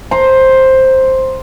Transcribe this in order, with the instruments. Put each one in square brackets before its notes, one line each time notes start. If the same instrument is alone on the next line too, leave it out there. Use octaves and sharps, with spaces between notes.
[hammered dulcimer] C5 A#5